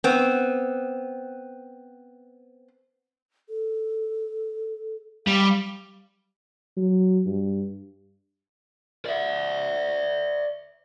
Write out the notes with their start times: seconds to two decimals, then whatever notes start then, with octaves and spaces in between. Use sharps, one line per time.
0.04 B3 C4
3.49 A4
5.27 G3 F5
6.77 F#3
7.26 G2
9.06 D5 E5